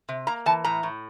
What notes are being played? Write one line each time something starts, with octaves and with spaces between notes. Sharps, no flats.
C3
A#3 A#5
E3 A5
A2 A#5
A2